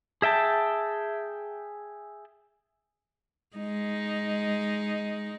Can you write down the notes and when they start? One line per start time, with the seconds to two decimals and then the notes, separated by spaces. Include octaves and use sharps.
0.22 G#4 E5 G5 A5
3.57 G#3 D#4